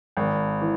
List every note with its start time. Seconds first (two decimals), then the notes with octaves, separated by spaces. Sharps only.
0.17 G#1
0.61 E3